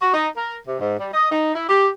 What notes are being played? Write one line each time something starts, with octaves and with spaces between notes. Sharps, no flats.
F#4
D#4
A#4
C3
G#2
G3
D#5
D#4
E4
G4